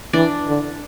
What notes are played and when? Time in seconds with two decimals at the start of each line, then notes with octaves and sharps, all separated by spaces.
0.13 E3 D4
0.48 D3